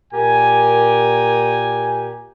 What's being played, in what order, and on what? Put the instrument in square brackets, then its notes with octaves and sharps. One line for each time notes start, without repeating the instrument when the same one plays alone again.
[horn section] A#2 G4 A#4 G#5